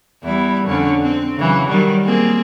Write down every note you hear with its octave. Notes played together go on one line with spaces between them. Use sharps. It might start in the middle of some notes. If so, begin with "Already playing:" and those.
E2 G3 E4
F2 D3 C#4
C4
C#3 E3 F#3
D#3 F#3 G3
A#3 C4 G#4